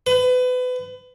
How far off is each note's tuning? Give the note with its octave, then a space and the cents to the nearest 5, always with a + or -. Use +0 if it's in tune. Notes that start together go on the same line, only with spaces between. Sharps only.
B4 +30